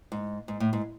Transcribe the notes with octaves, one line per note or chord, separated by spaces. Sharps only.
G#2
G#2
A2
G#2